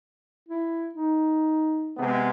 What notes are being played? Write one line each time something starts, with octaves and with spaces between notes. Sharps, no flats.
E4
D#4
C3 G#3 B3